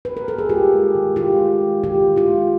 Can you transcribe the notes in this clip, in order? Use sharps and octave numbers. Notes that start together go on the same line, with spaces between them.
B4
A#4
A4
G#4
G#3 F4 G4
G#3
D#3
D#3 F4 G4
G#3
G#3
D#3 F4 G4
D#3
F4 G4
G#3